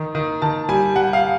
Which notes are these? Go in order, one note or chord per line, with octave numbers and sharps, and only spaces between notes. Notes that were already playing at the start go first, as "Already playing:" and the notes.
Already playing: D#3
D#3
D#3 A5
G3 G#5
G3 F#5
F5